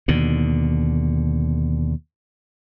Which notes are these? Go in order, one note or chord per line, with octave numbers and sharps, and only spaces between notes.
D#2 B2 D3